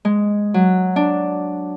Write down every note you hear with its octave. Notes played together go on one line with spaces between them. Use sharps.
G#3
F#3
D4